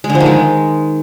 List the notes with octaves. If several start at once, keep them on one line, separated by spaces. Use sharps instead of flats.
G#3
D3
F3
D#3
G#3